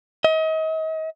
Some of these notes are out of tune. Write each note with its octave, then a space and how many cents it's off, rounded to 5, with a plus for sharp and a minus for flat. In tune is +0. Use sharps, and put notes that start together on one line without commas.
D#5 +35